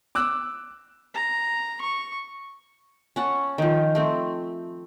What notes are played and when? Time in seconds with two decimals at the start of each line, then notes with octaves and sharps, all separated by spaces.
0.15 D6 E6 F#6
1.14 A#5
1.81 C#6
3.16 C#4 F#5 A5
3.58 D#3 F3
3.95 A3 C4